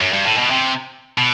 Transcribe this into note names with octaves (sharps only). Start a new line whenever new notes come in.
F#2
G2
A2
B2
C3
B2